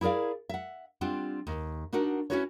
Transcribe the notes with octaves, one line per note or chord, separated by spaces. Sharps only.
E4 G#4 A#4 D5 F5
E5 F#5
G3 C4 D4 F4 F#5
D#2
D4 D#4 F#4 A#4 F#5
C#4 D4 E4 F#4 B4 C#5